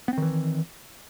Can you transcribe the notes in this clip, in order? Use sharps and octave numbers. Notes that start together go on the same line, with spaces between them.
D#3 E3 B3 C4